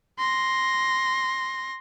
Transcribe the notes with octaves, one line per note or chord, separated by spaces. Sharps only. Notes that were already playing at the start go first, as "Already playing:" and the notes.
C6 A#6